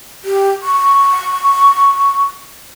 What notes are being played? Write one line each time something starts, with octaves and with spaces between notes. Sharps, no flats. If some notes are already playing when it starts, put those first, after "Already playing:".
G4
C#6